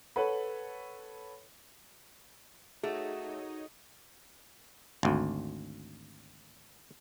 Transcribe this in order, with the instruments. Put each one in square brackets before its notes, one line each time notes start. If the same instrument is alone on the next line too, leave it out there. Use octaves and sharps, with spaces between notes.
[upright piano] A4 B4 C#5 F#5 B5
[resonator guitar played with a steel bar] A3 [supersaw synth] D#4 C#5 D#5 [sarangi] F#4 [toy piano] G#4
[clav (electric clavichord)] G#1 D2